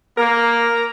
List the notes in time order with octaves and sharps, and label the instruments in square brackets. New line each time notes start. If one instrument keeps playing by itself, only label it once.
[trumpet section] A#3 [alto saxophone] A#4